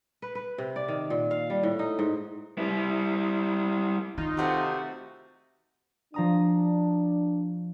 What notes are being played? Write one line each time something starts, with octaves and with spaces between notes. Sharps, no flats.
B4
B4
C3
D5
D#3
A#2
F5
G3
A2
D#4
G#2
G3 E4
D#3 D#4 F4
C3 A3 F#4 B4
F3 D4 A#5 D#6